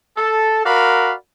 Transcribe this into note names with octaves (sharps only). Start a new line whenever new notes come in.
A4
F#4 A#4 D5 F5 B5